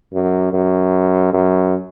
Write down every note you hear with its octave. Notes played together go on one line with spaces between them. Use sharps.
F#2
F#2
F#2